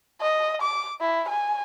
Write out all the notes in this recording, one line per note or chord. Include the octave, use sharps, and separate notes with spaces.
D#5
D6
E4
G#5